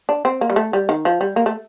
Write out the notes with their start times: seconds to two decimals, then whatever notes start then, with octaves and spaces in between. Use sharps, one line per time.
0.09 D4
0.25 C4
0.41 A#3
0.50 G3
0.56 A3
0.73 G3
0.89 D#3
1.05 F3
1.21 G3
1.36 A#3
1.46 A3